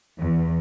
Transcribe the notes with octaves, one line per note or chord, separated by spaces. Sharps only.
E2